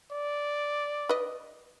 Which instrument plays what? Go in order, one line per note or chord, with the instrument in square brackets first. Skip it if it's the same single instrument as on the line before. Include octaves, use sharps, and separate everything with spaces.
[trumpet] D5
[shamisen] B4 D#5